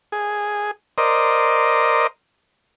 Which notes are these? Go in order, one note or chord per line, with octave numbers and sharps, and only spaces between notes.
G#4
A#4 C5 D5 D#5